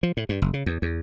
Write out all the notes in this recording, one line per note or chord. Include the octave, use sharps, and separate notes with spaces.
F3
A2
G2
F#1
C#3
E2
E2